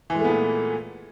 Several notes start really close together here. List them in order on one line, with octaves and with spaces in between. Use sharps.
E3 G#3 A3 B3 A#2